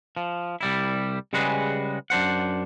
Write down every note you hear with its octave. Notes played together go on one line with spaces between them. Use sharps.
F3
C2 G3 E4
C#3 G3 G#3 F#4 G#4 B4
F#2 D4 C5 F#5